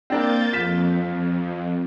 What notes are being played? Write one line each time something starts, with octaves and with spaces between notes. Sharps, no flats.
A#3 C4 D4 A#4 G6 A6
F2 F4 B6 E7